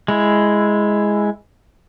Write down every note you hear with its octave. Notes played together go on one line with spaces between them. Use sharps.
G#3 E4